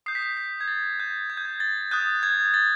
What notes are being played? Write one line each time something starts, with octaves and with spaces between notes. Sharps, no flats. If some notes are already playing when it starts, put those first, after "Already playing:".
D#6 G6 C7
B6
C7
B6
G#6
A6
G6
G#6
G6
G#6
A6
D#6 F#6 G6
G#6
A6